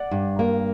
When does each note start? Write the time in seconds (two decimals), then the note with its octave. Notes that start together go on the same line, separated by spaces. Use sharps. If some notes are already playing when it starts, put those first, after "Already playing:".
Already playing: D5 F#5
0.11 G2
0.39 A#3